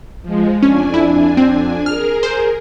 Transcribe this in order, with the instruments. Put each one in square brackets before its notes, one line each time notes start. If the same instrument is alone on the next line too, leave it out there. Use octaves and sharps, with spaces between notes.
[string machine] F3 G#3
[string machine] F2 D4 G#5 [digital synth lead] C#4
[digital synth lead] E4
C4
[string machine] G#4 A#4 [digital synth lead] F6
[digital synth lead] C5